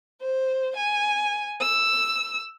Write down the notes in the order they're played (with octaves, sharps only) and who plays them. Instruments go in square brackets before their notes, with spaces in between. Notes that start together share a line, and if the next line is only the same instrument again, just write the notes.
[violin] C5
G#5
E6